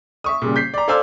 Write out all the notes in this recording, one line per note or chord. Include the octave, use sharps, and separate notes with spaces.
E5 C#6 D#6
A#2 C#3 G3
G6 B6 C7
D5 A#5
A4 C5 D5 F5 G#5 E6